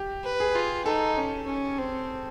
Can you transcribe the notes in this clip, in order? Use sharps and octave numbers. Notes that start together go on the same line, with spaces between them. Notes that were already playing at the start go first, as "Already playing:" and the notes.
Already playing: G4
B4
G#4
F4
D#4 A4
C#4
C#4
C4